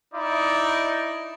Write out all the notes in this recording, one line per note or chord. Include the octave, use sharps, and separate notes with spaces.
D#4 E4 D5